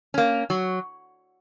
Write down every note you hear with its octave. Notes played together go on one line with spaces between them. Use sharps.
A#3 C#4
F#3